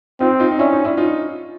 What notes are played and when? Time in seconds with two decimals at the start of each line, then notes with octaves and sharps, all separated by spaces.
0.20 C4 D#4 F4
0.40 D#4 F4
0.51 D#4
0.59 C#4 D4 E4
0.72 D#4
0.85 D4 E4
0.97 D#4 F4